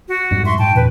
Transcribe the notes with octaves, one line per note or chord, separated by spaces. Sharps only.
F#4
F2 G#2 G3
E5 C6 C#6
G#2 G5 A5
E2 A#2 C#3 B4